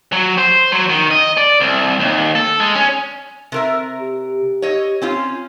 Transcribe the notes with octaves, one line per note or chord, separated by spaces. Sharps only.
F#3
C5
F#3
D#3
D#5
D5
C2
D#2
A4
G#3
C#4
C3 A#4 E5
G4
C#5 D#5
C4 C#4 F4